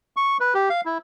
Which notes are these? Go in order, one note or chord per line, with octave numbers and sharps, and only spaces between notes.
C#6
B4
G4
F5
E4